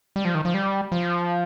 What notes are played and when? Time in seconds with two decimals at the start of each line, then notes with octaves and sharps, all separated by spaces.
0.16 G3
0.25 F3
0.35 D#3
0.45 F3
0.54 G3
0.92 F3